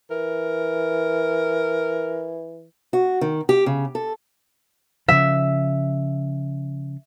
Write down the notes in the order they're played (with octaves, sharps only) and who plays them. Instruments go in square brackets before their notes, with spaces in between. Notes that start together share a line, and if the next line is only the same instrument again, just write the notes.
[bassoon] E3 [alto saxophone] A#4
[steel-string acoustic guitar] F#4
D#3
G4
C#3
A4
[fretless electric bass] C#3 F3 [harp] E5